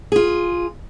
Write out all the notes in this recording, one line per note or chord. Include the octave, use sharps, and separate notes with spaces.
F4 G#4